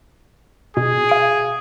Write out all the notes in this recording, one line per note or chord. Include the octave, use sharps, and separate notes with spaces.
B2 G#4
F5 D7